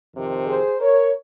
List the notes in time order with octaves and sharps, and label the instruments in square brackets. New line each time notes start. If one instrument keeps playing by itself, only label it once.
[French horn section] F2 C3 D#3
G#4 C5
A#4 C#5